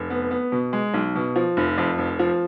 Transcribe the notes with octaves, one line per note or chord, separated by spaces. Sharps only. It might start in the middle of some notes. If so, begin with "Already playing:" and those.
Already playing: F1
B3
B3
B2
G#3
B1
B2
F3
F1
F2
F1
F3